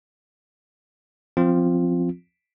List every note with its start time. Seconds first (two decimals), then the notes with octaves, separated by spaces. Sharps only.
1.37 F3 C4 F4